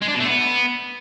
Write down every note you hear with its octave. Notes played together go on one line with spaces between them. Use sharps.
G#3
D4
B2
A3
B3